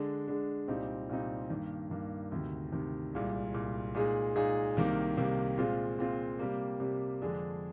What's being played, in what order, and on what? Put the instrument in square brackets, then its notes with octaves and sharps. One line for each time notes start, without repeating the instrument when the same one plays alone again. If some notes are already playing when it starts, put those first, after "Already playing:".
Already playing: [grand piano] D3 G#3 D4
D3 G#3 D4
C2 A#2 G3 C4 D#4
C2 A#2 G3 C4 D#4
G2 D#3 A#3
G2 D#3 A#3
D2 C3 D#3
D2 C3 D#3
C2 A#2 G#3
C2 A#2 G#3
A#2 G#3 D#4 G#4
A#2 G#3 D#4 G#4
C2 C3 D#3 A#3
C2 C3 D#3 A#3
A#2 G#3 C4 F4
A#2 G#3 C4 F4
C3 G3 A#3
C3 G3 A#3
F2 D3 G#3 D4 G#4